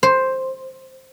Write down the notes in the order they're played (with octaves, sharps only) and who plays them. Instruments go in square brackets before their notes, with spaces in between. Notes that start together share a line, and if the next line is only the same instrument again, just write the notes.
[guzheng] C5